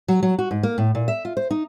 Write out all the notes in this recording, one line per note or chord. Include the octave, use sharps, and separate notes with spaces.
F#3
F#3
F#4
G#2
A#3
A2
A#2
E5
F4
C5
D#4